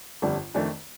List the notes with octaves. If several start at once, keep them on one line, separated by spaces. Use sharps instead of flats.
G1 F2 D3 G3 D4
F2 D#3 A3 D4